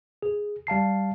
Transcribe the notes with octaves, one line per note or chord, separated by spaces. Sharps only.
G#4
G3 F5 A5 C7